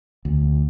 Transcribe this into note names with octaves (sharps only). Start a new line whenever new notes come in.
D2